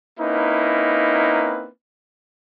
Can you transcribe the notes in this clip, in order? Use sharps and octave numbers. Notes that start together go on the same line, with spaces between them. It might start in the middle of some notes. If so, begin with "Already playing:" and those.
A#3 C4 C#4 D#4 E4 B4